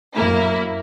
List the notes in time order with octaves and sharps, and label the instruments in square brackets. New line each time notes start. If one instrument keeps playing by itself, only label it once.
[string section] F#2 A#3 E4